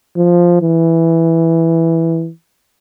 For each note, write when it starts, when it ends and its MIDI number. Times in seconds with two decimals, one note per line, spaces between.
0.17 0.60 53
0.62 2.30 52